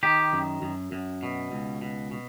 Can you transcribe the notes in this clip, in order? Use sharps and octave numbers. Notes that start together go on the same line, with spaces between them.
D#3 G4
F#2
F#2
F#2
B2
C#2
B2
B2